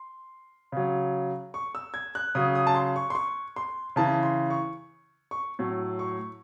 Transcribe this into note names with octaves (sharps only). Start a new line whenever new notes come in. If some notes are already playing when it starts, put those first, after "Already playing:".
Already playing: C6
C#3 F#3
C#6
E6
G#6
F#6
C#3 F#3 D#6
D#6
A5
C6
C#6
C6
C#6
C6
C#3 E3 A5
C6
C#6
C#6
A2 F#3
C#6